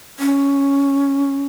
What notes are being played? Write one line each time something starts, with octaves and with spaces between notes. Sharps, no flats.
C#4